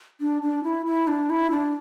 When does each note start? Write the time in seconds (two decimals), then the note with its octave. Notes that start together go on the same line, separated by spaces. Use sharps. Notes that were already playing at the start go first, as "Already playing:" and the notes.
0.21 D4
0.42 D4
0.64 E4
0.86 E4
1.08 D4
1.30 E4
1.51 D4